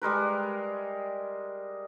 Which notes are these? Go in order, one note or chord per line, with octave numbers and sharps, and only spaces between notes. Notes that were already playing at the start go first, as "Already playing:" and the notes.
G3 G#3 A#4 B4